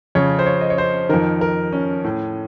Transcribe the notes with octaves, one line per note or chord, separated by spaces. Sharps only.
F2 C#3 C#5
C5
C#5
D#5
C#5
C5
F2 D#3 A#4
A#4
C#4
A2